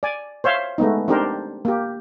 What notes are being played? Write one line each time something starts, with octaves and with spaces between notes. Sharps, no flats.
D5 G#5
C5 C#5 E5 F5
G#3 A3 B3 D#4
C4 D4 D#4 G4 A#4 C5
A#3 G4